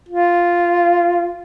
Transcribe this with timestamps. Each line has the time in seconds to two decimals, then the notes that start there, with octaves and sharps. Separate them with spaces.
0.09 F4